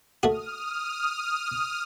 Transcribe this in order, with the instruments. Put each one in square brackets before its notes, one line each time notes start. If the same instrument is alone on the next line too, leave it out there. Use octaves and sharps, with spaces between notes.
[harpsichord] A3 F#4 [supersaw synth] D#6 F6